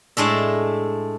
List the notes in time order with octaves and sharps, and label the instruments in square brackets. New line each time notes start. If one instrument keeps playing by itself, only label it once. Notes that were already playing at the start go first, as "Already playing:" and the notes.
[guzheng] A2 G#3 D4 E5